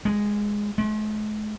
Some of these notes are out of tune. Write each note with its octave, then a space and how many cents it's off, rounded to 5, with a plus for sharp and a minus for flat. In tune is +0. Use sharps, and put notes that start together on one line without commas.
G#3 -5
G#3 +45